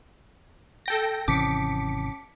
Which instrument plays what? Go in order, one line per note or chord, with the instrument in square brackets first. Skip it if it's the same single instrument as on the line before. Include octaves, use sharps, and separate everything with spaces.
[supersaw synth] A4 G5 A#6
[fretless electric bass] G#1 C3 E3 [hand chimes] C#4 A5 [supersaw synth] D6 B6 C#7